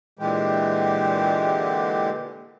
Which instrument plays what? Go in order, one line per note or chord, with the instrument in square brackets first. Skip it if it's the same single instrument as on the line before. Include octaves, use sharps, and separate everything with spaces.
[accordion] A#2 D3 E3 G#3 G4